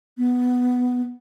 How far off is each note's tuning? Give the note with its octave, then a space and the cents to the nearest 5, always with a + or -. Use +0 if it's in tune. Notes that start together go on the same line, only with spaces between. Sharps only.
B3 +5